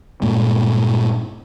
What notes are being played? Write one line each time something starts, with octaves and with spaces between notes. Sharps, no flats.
G2 A#2 G#3